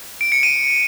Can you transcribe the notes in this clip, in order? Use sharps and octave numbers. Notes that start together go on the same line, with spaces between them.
D7
C#7
D#7